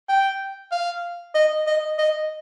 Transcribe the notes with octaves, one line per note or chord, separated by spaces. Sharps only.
G5
F5
D#5
D#5
D#5